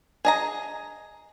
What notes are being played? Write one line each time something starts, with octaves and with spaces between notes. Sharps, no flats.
G#4 D#5 A#5